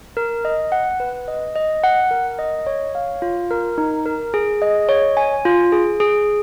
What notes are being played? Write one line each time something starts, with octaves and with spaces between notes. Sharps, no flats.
A#4
D#5
F#5
B4
D#5
D#5
F#5
A#4
D#5
C#5
F5
F4
A#4
D#4
A#4
G#4
D#5
C#5
G#5
F4
G#4
G#4